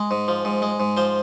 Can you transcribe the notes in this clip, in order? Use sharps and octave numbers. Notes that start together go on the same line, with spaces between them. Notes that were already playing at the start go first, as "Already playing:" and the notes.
Already playing: G#3
G#2
F3
G#2
G#3
G#2
F3 C5